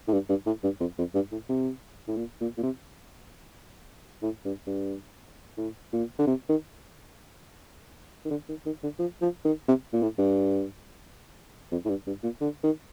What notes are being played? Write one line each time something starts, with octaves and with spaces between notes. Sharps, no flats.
A2
G2
G2
A2
G2
F2
F2
G2
A2
C3
A2
A#2
A#2
A#2
C3
A2
G2
G2
A2
A#2
D3
C3
D#3
D#3
D3
D#3
D#3
D3
F3
F3
D#3
C3
A#2
A2
G2
F2
A2
G2
G2
A#2
D3
D#3